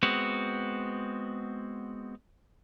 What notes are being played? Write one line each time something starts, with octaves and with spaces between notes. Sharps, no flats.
G#3 B3 C4 F#4